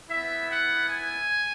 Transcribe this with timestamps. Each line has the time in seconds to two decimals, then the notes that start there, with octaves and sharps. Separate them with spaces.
0.10 E4 E5
0.15 B3
0.50 F#5
0.88 G#5